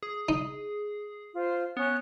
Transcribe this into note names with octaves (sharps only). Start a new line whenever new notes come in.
G#4
D#4
F4 C5
B3 C#4 C#5 F#6